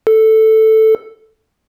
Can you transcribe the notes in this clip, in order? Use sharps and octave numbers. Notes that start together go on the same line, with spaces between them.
A4